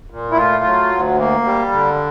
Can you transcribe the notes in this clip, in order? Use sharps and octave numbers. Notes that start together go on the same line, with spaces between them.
A#2
E4
A3 F4
F#3
D2
A#3
G3
D3